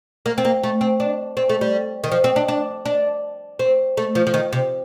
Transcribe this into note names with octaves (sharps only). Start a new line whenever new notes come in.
A#3
C4
A#3
A3
C4
D4
C4
A3
G3
D#3
F3
C4
D4
D4
D4
C4
A3
F3
F3
D#3
C3